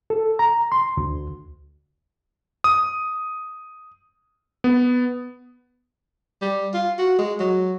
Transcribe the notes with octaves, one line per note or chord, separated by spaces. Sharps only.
A4
A#5
C6
D2
D#6
B3
G3
F4
F#4
G#3
F#3